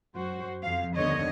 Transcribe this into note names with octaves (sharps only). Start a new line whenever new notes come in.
F#2 F#4 C5
F2 F3 F5
D#2 D3 B3 C#5 D#5